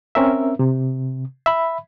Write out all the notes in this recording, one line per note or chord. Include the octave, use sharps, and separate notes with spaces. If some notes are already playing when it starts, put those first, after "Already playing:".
C4 C#4 A#4 E5
C3
E5 B5